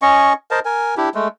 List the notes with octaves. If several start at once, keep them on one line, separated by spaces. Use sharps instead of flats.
C#4 D#5 C#6
A#4 C5 D#5 A5
A#4 G#5
D4 E4 G4
G#3 A3